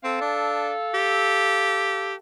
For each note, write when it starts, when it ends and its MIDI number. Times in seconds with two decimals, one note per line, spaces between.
0.03 0.20 60
0.03 2.13 69
0.03 2.13 77
0.21 0.72 62
0.94 2.15 67